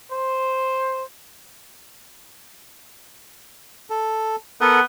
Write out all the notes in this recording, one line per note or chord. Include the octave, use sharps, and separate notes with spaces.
C5
A4
B3 A4 A#4 F#5